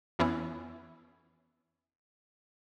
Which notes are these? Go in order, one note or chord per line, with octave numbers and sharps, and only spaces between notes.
F2 E3 B3 C#4 E4